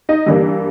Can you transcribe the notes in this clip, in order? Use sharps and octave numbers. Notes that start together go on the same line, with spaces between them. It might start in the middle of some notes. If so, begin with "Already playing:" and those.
D#4 D#5
G2 E3 G3 A#3